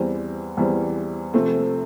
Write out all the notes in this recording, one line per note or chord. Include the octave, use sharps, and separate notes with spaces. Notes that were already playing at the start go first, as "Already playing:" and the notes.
Already playing: E2 E3 G3 C4
E2 E3 G3 C4
C3 F3 A3 C4